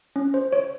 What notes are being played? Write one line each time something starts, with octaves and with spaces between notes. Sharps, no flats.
C#4
C5
C#5